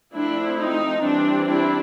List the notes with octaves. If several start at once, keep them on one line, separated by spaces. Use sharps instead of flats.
F3 A3 C4 D4 E4
D#4
E3 G3 C4 D4
D4 E4